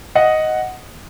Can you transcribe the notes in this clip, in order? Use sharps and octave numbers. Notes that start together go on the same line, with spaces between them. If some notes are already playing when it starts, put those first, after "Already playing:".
D#5 F#5